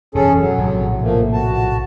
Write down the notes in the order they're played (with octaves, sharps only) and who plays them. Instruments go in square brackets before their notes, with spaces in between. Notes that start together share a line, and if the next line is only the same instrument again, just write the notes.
[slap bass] E1 F#2 B2 [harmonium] C#4 G#4 A4
[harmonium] F#3
[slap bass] A#1 A2 C3
[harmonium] F3 A3 A#3
F#4 A5